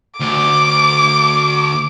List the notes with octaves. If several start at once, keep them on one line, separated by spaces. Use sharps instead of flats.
D2 D6